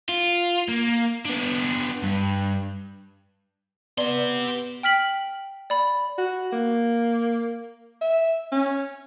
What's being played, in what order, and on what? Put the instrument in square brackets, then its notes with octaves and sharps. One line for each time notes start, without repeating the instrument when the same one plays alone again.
[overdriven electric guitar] F4
A#3
B3 D4
G2
[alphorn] B3 [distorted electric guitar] G4 C6 [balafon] D5
[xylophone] G5 F6 B6 F#7
D5 B5
[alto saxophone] F#4
A#3
E5
C#4